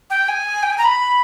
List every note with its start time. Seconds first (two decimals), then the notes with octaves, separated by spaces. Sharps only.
0.10 G5
0.28 G#5
0.63 G5
0.70 G#5
0.78 A#5
0.85 B5